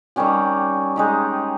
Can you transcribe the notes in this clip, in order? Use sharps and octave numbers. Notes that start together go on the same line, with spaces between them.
D#3 G3 C#4 G4
G#3 D#4 G4